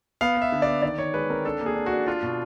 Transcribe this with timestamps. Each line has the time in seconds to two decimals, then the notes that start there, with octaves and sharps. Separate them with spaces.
0.21 B3 F5
0.37 B3 E5
0.52 D3
0.62 B3 D5
0.82 D#3 D5
0.98 D#3 C#5
1.14 G#3 B4
1.30 C4 A#4
1.45 D4 A4
1.61 A#3
1.66 G#4
1.76 D4
1.86 F#4
1.92 D4
2.07 D4 F4
2.23 B2